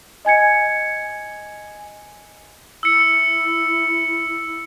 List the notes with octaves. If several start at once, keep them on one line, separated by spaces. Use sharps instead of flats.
D#5 G#5 G#6 C#7
E4 E6 C#7